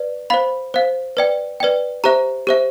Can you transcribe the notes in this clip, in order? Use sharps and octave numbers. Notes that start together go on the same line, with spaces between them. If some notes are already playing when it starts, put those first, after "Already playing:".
Already playing: B4 D5
C5 F5 B5
C5 F5
B4 D5 G5
B4 D5 G5
G4 C5 E5 A#5
G4 C5 E5